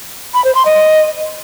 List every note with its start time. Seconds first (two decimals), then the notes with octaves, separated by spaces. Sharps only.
0.34 B5
0.45 C5
0.55 C6
0.65 D#5